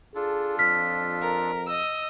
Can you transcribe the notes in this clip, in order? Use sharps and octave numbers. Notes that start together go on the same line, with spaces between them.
D4 F4 G#4 A4
F2 F6 B6
A#4
D#5 E6